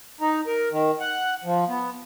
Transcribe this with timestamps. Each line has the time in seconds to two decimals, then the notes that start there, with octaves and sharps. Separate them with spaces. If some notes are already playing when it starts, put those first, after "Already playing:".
0.21 D#4
0.47 A#4
0.71 D#3
1.00 F#5
1.44 F3
1.68 B3